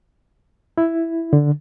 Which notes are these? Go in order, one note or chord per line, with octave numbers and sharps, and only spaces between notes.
E4
D3